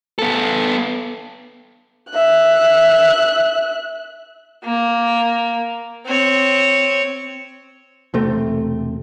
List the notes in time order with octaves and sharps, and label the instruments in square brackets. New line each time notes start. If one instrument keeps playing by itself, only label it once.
[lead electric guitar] B3 A4
[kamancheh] E5 F#6
[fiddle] A#3
C4 C#5
[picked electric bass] E1 C3 A3 C4